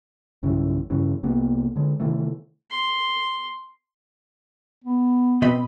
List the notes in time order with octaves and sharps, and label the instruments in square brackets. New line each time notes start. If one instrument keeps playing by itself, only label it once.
[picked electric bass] B1 G2 C#3 E3
G2 C#3 E3
C2 C3 A#3 B3
D3 G#3
C3 D#3 E3 A3
[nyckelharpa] C6
[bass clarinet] B3
[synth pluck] B2 B5 [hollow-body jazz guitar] C4 D#5